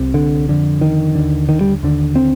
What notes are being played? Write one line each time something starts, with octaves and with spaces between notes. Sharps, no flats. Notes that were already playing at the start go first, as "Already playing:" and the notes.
Already playing: C2 C3
D3
F2 D3
D#3
D#2 D3
D#3
G3
D#2 D3
C4